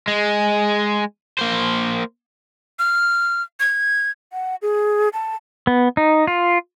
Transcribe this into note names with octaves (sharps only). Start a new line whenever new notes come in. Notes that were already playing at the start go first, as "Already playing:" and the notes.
G#3
A#3 C5
F6
G#6
F#5
G#4
A5
B3
D#4
F4